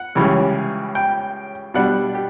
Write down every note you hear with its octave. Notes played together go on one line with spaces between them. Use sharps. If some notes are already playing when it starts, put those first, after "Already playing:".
Already playing: F#5
C#2 C#3 E3 G3 C#4
G5
B2 G3 D4 F#5
G4